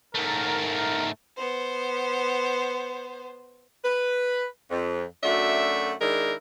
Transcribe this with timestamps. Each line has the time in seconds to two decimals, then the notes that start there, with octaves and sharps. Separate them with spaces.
0.15 G#2 A3 A#4
1.37 B3 C5
3.85 B4
4.71 F2
5.23 F#2 A3 D4 F#4 E5
6.00 D#3 G#3 D4 E4 A#4